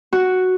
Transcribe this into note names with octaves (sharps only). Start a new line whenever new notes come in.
F#4